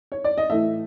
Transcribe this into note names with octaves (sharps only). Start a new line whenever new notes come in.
C#5
D5
D#5
A2 E3 A3 E5